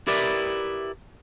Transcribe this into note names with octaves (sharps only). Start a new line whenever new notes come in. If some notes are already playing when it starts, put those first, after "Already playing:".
E4 G4 A#4 B4 D5 E5